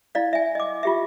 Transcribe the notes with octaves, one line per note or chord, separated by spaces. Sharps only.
E4 D5 F5
E5 G#5
D#5 D6
F4 G4 E5